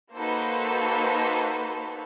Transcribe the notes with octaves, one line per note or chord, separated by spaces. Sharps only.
A#3 D#4 F#4 A4 B4 C5